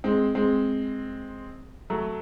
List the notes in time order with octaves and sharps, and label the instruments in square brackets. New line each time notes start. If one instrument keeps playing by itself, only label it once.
[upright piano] G#3 C4
G#3 C4
F#3 A3